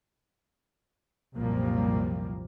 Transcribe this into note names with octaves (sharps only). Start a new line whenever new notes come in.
C2 F#2 A#2 F3 G3 A#3